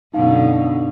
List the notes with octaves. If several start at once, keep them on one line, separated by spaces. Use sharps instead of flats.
F#2 B2 D3 D#4 F5